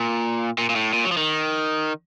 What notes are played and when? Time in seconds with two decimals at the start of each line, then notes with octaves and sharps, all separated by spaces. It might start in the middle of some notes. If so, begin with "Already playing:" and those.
Already playing: A#2
0.58 A#2
0.69 A#2
0.76 A2
0.93 A#2
1.05 F#3
1.12 F3
1.17 D#3